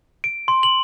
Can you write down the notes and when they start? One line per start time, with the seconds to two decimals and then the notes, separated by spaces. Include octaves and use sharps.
0.24 D7
0.48 C6
0.63 F#7